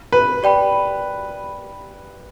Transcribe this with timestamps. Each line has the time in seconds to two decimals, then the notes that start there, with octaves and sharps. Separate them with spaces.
0.12 B4
0.43 G4 D5 G5 B5